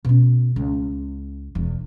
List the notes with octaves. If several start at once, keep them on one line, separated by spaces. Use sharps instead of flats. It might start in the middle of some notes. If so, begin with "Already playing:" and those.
B2 C#4
C#2
E1 E2